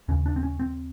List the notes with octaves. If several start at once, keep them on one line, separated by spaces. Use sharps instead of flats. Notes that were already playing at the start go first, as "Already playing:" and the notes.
D#2 C#3 C#4
D4
C4
C#4
C4